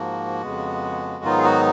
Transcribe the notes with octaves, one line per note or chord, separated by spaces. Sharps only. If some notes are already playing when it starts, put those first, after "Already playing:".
Already playing: G#2 F3 A#3 F#4
F2 C#3 G#3 B3
G#2 D#3 F#3 B3 D#4 F4
G#4
F#4